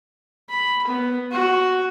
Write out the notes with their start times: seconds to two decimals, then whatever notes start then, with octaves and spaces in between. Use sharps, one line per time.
0.50 B5
0.87 B3
1.32 F#4